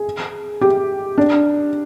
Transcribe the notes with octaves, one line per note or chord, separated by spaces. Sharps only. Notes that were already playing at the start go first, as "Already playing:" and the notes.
Already playing: G#4
G4
D4